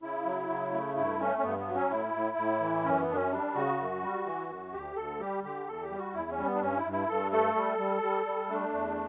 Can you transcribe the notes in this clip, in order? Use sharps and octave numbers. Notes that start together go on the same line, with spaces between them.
C#3 E4
F#3
C#3
A3
G2 E4
A3 C#4
C#4
G2 B3
B3
F#3
C#4
A2 E4
A2
A2
E3
F#2 C#4
B3
F#2 D4
C#4
G3 D4
C#3 F#4
F#2
G3
E3
F#2
D2 G4
D2 A4
G3 G4
D3 G4
E2 A4
G4
G3
F#4
E2 E4
C#4
G3
B3
D4
G2 C#4
E4
G2
E4
G2 A4
A3 A4
G3
G3
G3
G3
A3 D4
E2